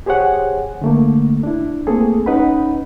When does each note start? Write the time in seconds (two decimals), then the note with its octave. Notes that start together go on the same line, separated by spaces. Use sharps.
0.06 G4 G#4 C5 C#5 F#5 G#5
0.82 D3 A3 A#3
1.43 D4 E4
1.87 A3 A#3 C4 G#4 A4
2.26 C#4 D#4 B4 F#5 B5